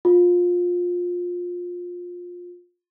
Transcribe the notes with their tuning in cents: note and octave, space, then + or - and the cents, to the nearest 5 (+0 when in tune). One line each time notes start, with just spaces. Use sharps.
F4 +20